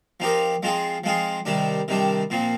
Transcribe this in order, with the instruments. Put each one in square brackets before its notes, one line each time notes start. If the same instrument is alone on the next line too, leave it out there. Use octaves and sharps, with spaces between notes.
[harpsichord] F3 C4 D#4 G4 A#4
F3 G#3 C4 F4 G#4
F3 G#3 C4 F4 G#4
C3 D#3 G3 D4
C3 D#3 G3 D4
A#2 F3 C4